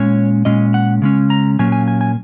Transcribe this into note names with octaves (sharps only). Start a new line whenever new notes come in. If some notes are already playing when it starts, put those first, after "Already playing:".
Already playing: A#2 G#3 C#4 C#5
A#2 G#3 C#4 D#5
F#5
C#3 G#3 C#4
A#5
A#2 F#3 A#3 C#4 G#5
G#5
G#5
G#5